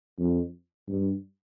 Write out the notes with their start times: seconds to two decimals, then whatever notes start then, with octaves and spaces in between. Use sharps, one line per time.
0.19 F2
0.88 G2